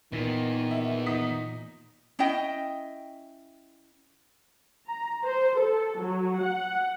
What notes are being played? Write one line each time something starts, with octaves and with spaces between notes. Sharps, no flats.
A#2 D#3 E3 B3
E5
D#4 D#6 B6
C#4 E4 D#5 G5
A#5
C5
A4
F#3
F#5